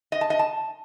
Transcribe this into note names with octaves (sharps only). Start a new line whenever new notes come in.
D#5
A5
D#5
A5